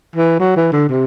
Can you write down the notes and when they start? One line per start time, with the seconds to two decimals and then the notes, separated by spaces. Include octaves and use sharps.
0.16 E3
0.40 F#3
0.56 E3
0.72 D3
0.89 C3